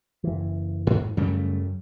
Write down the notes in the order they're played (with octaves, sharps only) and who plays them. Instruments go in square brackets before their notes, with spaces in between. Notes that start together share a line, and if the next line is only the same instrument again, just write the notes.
[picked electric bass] F#1 E3
[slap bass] G#2
[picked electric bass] F#2 [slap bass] C#3 G3 A3